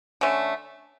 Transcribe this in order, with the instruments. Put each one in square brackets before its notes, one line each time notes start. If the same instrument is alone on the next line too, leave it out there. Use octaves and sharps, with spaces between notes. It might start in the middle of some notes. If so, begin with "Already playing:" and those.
[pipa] D3 A3 C#4